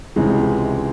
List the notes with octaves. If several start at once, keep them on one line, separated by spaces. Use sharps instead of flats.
C#2 C3 E3 G#3 C#4